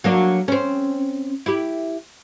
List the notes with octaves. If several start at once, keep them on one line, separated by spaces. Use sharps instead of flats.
F#3 A#3 D4
C4 C#4
E4 G4